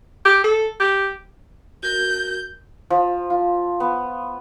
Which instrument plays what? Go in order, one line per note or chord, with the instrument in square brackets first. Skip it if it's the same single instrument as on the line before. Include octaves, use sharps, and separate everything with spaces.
[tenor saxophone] G4
A4
G4
[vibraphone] F#4 A#4 [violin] G6
[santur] F3
F4
B3